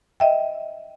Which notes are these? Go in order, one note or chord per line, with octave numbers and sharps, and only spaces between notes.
D#5 E5 G5